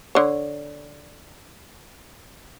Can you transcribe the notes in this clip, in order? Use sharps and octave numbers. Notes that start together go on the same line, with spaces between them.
D3 C#5